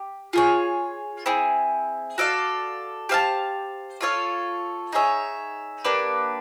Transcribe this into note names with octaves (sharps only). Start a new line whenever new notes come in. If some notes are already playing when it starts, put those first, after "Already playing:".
Already playing: G4
F4 G#4 C#5
C4 E4 G#4
F#4 A4 D5 F5
G4 C5 F5 A5
F4 A4 C#5 F5
D#4 G#4 C#5 E5
A#3 D4 G4 B4